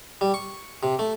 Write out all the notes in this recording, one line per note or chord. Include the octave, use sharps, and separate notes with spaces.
G3
C#6
C3
A3